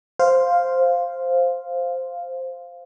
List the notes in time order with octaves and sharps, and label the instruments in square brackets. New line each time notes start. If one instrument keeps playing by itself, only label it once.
[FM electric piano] C5 F5